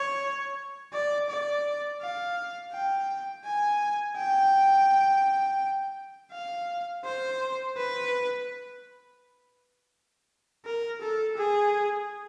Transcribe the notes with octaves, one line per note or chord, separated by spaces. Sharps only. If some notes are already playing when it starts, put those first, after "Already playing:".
Already playing: C#5
D5
D5
F5
G5
G#5
G5
F5
C5
B4
A#4
A4
G#4